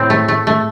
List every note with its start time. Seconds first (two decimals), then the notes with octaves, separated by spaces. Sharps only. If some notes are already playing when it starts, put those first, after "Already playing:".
Already playing: A2 C4
0.10 A3
0.28 A3
0.47 A3